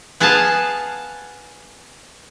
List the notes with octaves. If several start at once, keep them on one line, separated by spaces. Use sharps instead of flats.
B3 G#4 B4 F5 A5